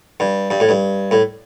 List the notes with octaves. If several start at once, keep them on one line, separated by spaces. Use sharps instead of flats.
G2
G2
A2
G2
A2